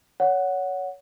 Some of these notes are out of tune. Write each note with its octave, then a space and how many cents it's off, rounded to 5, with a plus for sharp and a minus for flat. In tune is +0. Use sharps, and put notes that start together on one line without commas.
C#5 +20 F#5 +0